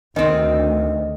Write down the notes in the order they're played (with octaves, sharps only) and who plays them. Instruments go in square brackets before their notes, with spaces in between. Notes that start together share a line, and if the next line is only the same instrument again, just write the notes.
[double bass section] D2 [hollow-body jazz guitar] D#3 C4 [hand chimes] D#5